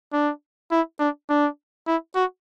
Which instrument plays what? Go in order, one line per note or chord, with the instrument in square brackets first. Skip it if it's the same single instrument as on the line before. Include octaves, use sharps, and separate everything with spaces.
[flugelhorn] D4
E4
D4
D4
E4
F#4